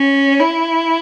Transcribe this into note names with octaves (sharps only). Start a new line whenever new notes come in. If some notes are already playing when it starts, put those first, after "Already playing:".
Already playing: C#4
E4